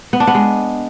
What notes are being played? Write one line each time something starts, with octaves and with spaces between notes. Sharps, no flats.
B3
D4
B3
G#3